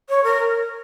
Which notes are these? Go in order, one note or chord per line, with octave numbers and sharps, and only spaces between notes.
C#5
A#4